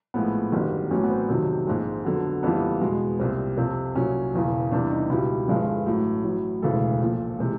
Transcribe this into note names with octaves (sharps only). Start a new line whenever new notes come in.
A#1 A2 F3 G#3 B3
G1 F#2 D#3 G3
A1 A2 F#3 C#4
B3
C4
F2 C3 D#3 F#3
A#1 G#2 F3 G#3
F2 D3 F#3 B3
F#1 F2 C#3 E3 G3 B3
E2 B2 G#3
C2 A#2 G3 C4
F2 C3 F3
C2 A#2 F#3 C#4
E1 E2 C#3 E3
E2 C3 E3 G3 D4
D#4
C#2 B2 G3 E4
G1 G2 D3 F3 G#3
A1 A2 F#3
A1 A2 F#3
E1 D2 C#3 E3 G#3 A4
A#1 A#2 F3
C3 E3 G#3